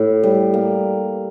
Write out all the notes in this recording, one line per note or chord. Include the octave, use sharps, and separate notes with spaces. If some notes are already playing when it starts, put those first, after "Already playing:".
Already playing: A2
G3
A#3